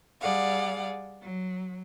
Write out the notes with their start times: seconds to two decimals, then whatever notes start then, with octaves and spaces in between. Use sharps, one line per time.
0.21 G3 G#4 D5 F5 F#5
1.21 F#3